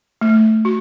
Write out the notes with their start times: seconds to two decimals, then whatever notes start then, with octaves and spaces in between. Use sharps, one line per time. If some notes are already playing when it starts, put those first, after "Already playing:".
0.21 A3
0.65 F#4